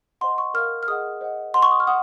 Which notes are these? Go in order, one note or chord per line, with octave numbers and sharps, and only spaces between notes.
C5 D#5 F#5 C6
C#6
A#4 F5 F6
F6
G#4 D#5 F#5 D#6
C5 D#5 F#5
C5 D#5 F#5 C6
C#6
D#6
F6
F#5 D#6